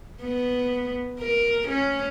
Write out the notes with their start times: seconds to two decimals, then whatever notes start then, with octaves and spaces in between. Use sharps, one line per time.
0.22 B3
1.21 A#4
1.68 C#4